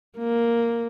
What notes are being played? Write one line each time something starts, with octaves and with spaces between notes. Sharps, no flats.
A#3